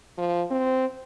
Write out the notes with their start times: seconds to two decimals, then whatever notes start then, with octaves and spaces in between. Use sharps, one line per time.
0.18 F3
0.51 C4